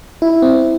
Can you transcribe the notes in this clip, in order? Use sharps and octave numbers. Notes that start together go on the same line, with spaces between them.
E4
C4